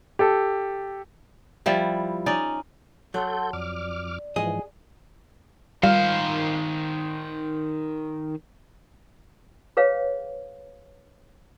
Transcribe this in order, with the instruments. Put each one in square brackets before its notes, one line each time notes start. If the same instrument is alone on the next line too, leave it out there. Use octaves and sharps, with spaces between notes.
[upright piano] G4 A4
[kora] F3 G3 E4
C#4 D#4 D5
[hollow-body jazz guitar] F#3 [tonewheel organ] A4 G6 [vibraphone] F#5 A5 C6
[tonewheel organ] F2 D6 F6 [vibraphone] D5
[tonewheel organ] G#2 E3 F3 [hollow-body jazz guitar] G#4 D#5
[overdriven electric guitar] D#3 C5 [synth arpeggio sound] G3 [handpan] F5
[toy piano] G#4 B4 C#5 F5